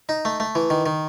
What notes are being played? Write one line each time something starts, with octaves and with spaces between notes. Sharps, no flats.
D#4
A3
A3
E3
D#3
D#3